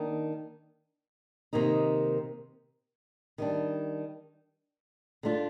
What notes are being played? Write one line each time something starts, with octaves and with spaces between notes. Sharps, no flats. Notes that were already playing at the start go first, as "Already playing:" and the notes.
Already playing: D#3 A#3 D4
C3 D#3 A#3 D#4
D#3 G3 D4
D3 A3 D4 F4